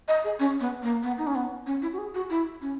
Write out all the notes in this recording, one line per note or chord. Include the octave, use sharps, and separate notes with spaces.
D#5
G#4
C#4
B3
A#3
B3
D#4
C#4
B3
C#4
E4
F#4
G#4
F#4
E4
C#4